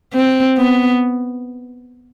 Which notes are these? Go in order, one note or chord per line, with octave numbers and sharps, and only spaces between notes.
C4
B3